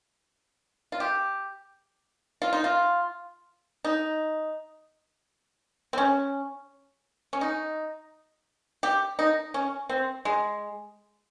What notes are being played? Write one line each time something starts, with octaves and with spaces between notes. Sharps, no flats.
F4
G4
F4
D#4
F4
D#4
C4
C#4
C#4
D#4
G4
D#4
C#4
C4
G#3